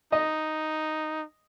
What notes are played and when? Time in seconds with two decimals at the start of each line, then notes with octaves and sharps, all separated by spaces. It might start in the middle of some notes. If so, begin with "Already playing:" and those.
0.12 D#4 D#5